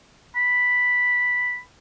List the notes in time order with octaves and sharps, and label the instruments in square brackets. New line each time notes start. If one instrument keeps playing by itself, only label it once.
[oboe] B5